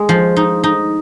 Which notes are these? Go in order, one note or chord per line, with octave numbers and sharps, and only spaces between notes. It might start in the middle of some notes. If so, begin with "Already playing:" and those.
Already playing: G#3
F3
D#4
D#4